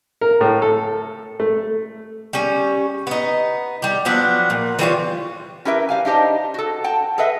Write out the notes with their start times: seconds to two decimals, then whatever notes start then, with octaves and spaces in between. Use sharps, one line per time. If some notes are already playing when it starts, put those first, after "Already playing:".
0.21 A#4
0.41 A2
0.62 A4
1.40 A3
2.33 G3 C#4
3.07 B3 D#4
3.82 G3 G4
4.05 F3 F#3 B3 D4
4.50 A#2
4.79 E3 G3 F4 C#5
5.65 C#4 E4 G4 A#4 B4 E5
5.89 G3 F5 G#5
6.05 D4 D#4 G4 C5 D#5
6.54 F#4 A4
6.84 F#5 G5 A5
7.18 G#4 A4 B4 D#5 E5